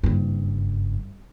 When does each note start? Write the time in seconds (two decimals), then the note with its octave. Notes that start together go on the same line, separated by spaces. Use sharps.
0.04 F#1 G2